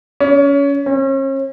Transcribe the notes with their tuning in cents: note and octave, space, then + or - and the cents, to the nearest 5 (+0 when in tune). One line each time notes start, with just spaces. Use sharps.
C#4 +25
C#4 -40